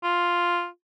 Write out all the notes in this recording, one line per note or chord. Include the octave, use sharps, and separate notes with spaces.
F4